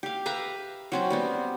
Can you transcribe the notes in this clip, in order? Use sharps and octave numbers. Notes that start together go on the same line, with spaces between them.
G4 F5
B4 E5 F5 A#5
F#3 C4 C#4
G3 B3 C4